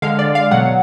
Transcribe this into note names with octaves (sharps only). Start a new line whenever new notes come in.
D3 G#3 F5
D5
F5
B2 F#3 F#5